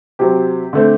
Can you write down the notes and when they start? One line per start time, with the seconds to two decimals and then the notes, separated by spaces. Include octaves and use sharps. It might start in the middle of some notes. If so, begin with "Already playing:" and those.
0.19 C3 F#3 C4 G4
0.73 D3 A3 C4